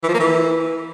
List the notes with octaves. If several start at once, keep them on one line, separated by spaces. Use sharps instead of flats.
E3
F3
A#3
E3